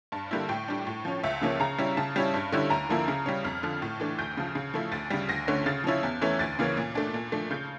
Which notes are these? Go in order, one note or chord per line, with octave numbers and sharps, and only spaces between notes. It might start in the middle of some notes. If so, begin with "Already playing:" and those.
G2 A5
D3 G3 A#3 E4
A2 G5
G3 D4
A2
F3 C#4
C#2 E5
C#3 F3 A#3 C#4
C#3 A#5
G3 C#4 E4
C#3 A5
G3 C#4 E4
G2
D3 G3 C#4 E4
D2 A#5
D3 F3 A#3 E4
C#3
G3 C#4
F2 F6
D3 F3 F6
A2
E3 A3 D4
D2 G6
C#3 F3
C#3
F3 A3 E4
D2 A6
C#3 G3
D2 A#6
D3 A3 C#4
C#3 A6
F3 C#4 E4
E2
E3 A3 C#4 E4
D2 A6
C#3 E3 A#3 C#4
A#2
A3 D4
A#2
F3 A3 D4
C#3 G6